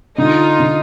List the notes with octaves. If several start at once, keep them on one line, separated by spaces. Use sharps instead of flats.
D3 D#4 F4
D3